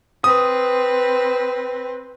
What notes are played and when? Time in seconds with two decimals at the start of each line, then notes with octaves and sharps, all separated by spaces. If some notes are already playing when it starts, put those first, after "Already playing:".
0.24 C4 B4 D#6